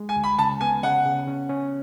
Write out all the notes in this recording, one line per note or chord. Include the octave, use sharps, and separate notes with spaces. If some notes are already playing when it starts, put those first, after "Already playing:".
Already playing: G#3
G#5
D2
B5
C#3 A5
B3 G#5
C#3 F#5
C#3
C#4
C#4